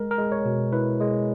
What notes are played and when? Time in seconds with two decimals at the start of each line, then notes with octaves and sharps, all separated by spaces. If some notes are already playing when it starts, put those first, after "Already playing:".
Already playing: G#3 A#4
0.11 A#4
0.18 G#3
0.32 C#5
0.46 B2
0.73 E4 B4
1.00 G#3